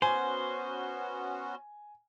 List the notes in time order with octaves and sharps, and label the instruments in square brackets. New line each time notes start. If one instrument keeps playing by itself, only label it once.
[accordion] B3 C#4 F#4 [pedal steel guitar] C5 [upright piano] G#5